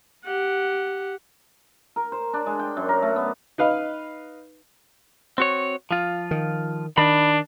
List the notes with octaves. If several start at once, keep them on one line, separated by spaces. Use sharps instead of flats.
G4 F#5
A#4
C5
D4
G#3
G5
F#2
A#4
A3
B3
D#4 B4 F5
C4 F#4 C#5
F3 F4
D#3
D#3 D4 B5